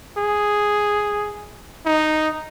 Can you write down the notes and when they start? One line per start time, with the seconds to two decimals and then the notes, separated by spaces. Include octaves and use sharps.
0.18 G#4
1.86 D#4